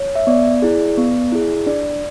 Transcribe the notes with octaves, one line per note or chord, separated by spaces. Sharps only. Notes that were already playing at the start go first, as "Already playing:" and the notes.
Already playing: C#5
E5
B3 D5
E4 G#4
B3
E4 G#4
D4 D5